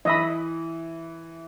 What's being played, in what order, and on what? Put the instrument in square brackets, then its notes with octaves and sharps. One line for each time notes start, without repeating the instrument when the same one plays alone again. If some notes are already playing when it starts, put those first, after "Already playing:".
[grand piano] E3 [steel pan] D#5 E5 B5